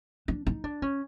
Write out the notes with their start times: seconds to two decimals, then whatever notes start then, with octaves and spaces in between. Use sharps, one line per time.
0.28 D4
0.46 D#4
0.64 D4
0.82 C#4